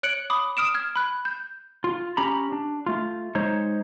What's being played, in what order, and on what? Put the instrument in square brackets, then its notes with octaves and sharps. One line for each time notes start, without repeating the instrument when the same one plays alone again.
[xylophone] C#5 F#6 C#7 D7 F#7
B5 D6 D#6
D#6 F6 D7 E7
F6 G#6
B5 F#6
G6
[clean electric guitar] F4
C#4 G4 A#5 B5
D4
A3 F4
G#3 D#4 C5 C#5